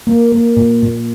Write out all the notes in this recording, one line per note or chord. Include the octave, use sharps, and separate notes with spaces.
A#3
A#3
A#2
A#2